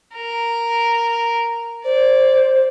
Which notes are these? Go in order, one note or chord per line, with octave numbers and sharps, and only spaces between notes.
A#4
C5 D5